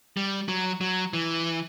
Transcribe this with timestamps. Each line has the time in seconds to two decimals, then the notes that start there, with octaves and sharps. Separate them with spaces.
0.17 G3
0.48 F#3
0.81 F#3
1.13 E3